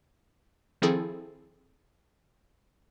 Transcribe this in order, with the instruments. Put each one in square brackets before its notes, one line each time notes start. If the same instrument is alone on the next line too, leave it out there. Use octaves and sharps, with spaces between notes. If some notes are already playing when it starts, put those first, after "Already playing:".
[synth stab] D#3 F3 C4 E4 G#4 A4